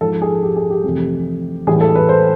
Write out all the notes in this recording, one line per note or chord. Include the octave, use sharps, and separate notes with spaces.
G#2 F3 G#3 A4
G#4
G4
G#4
G4
F2 C3 E3 A3
A2 E3 G3 G#4
A4
B4
C5